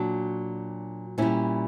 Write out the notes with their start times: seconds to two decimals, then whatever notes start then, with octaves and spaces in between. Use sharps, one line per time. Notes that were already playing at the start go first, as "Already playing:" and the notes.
Already playing: A#2 F#3 D4 F#4
1.18 A#2 G3 C#4 E4